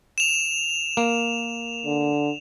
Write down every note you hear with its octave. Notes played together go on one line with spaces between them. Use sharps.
E7 F7
A#3
D3